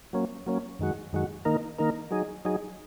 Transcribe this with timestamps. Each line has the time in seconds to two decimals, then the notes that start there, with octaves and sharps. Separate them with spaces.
0.13 F#3 A#3 C#4
0.46 F#3 A#3 C#4
0.79 F#2 D#3 G#3 F#4
1.13 F#2 D#3 G#3 F#4
1.45 D#3 A#3 D#4 A#4
1.78 D#3 A#3 D#4 A#4
2.11 F#3 D#4 G#4
2.45 F#3 D#4 G#4